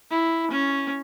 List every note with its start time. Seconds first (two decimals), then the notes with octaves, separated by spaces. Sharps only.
0.10 E4
0.51 C#4